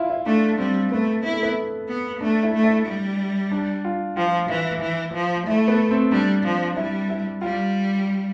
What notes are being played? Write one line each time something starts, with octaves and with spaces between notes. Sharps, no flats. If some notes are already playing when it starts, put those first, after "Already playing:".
Already playing: E4 F4
E4
A3 D4
G3 C4
A3 B3
B3 E4
A3
B3
B3
A3 D4
E4
A3
E4
G3
D4
F4
F3 F4
E3 E4
E3
F3
A3 E4
B3
C4
G3 D4
F3
G3 E4
E4
G3 F4